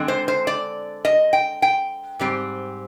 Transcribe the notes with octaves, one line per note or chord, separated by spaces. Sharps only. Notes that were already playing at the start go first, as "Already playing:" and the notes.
Already playing: D3 G#3 C4
C5
C5
D5
D#5
G5
G5
G#2 G3 C4